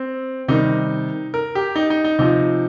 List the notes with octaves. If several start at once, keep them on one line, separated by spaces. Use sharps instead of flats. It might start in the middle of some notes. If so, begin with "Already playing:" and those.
Already playing: C4
C3 D#3 G3 D#4
A#4
G4
D#4
D#4
D#4
C3 F3 D#4